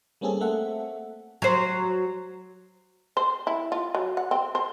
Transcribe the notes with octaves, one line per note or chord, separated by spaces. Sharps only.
G3 A#3 C4 C#4 G#4 A4
A3 A#3 C4 A4 E5 F#5
F#3 C5
C5
E4
F4
F#3
F#5
C4
C5